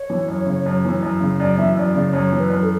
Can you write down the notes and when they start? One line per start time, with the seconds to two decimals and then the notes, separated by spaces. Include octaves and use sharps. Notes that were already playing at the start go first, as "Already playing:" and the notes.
Already playing: C#5
0.10 E3
0.28 F#2
0.46 C#3
0.66 F#2
0.85 E3
1.02 F#2
1.20 C#3
1.39 F#2 D5
1.58 E3 E5
1.77 F#2 D5
1.94 C#3 D5
2.13 F#2 C#5
2.32 E3
2.39 B4
2.50 F#2
2.62 A4